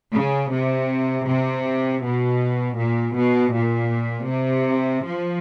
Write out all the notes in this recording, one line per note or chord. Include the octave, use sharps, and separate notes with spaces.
C#3
C3
C3
B2
A#2
B2
A#2
C3
F3